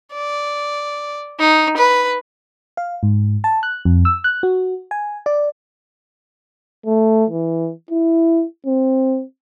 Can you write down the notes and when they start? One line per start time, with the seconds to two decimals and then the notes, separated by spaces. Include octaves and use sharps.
0.13 D5
1.39 D#4
1.77 B4
2.77 F5
3.03 G#2
3.44 A5
3.63 F#6
3.85 F2
4.05 E6
4.24 F#6
4.43 F#4
4.91 G#5
5.26 D5
6.86 A3
7.30 E3
7.91 E4
8.66 C4